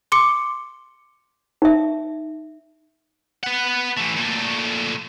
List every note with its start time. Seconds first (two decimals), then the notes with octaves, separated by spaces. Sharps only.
0.12 C6 D6 C#7
1.62 D#4 E5
3.43 B4 F#5
3.97 E3 A3
4.17 A#2 A3